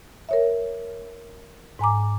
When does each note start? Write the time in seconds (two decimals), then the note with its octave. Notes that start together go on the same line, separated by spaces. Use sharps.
0.29 A#4 C#5 E5
1.79 G#2 G#5 A#5 D6